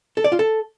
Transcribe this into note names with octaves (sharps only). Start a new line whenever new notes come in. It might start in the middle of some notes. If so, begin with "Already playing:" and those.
A4
D5
F4
A4